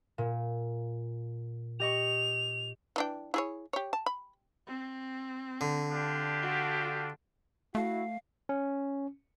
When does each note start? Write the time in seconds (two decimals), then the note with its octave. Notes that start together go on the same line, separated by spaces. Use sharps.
0.18 A#2
1.80 G4 D#5 C#6 F7
2.96 E3 D4 G5
3.34 E4 G#4 C#5
3.73 G4 C#5
3.93 A5
4.06 B5
4.66 C4
5.61 D3
5.92 D4 F4 G4
6.42 F#4 A4
7.75 A3 E4 F#4 F5
8.49 C#4